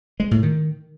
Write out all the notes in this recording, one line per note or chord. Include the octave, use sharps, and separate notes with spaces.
G#3
A2
D#3